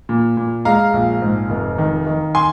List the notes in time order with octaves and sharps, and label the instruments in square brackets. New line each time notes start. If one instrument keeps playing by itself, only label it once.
[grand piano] A#2
A#2
G#3 F5 A#5
A#1
G#2
F1
D#3
D#3
G#5 C6